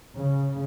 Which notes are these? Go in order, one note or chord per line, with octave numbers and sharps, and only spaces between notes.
C#3